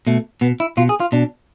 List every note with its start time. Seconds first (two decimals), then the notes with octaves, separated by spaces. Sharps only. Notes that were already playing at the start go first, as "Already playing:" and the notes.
0.07 B2 A3
0.41 B2 B3
0.60 E4
0.77 B2 F4
0.89 G#4
1.00 F4
1.12 B2 D4